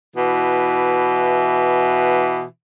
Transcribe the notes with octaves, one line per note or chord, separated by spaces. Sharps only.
B2 E3